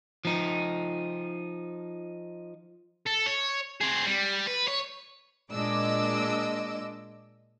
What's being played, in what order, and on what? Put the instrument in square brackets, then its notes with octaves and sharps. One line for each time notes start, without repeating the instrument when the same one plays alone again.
[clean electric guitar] F3 D#4
[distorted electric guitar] A4
C#5
C4 G#4
G3
B4
C#5
[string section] A#2 G#3 D4 D#5 D6 E6